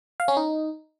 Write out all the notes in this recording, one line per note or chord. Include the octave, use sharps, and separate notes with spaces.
F5
C#4
D#4